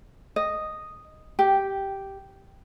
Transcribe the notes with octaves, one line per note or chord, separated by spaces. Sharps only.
D#5
G4